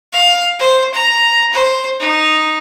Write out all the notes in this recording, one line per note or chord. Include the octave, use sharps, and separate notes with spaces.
F5
C5
A#5
C5
D#4